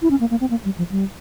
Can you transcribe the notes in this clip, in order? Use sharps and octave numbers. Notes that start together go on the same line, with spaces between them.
E4
C#4
A#3
A#3
C4
A#3
G3
F3
G3